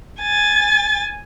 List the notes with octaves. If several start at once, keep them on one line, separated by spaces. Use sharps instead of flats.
G#5 A6